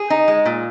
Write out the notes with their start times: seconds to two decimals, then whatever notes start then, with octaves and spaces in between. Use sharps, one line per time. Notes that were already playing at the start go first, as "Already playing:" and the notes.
Already playing: G#4
0.10 D#4
0.28 G#3
0.46 A#2